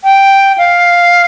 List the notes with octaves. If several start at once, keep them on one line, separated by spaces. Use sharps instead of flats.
G5
F5